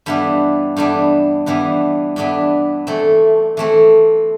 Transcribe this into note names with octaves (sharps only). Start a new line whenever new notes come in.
G2 E3 B3 D4
G2 E3 B3 D4
G2 E3 B3 D4
G2 E3 B3 D4
E3 A3 C4
E3 A3 C4